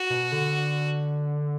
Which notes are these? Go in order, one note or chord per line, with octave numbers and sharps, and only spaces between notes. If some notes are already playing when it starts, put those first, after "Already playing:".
Already playing: F#4
B2
D3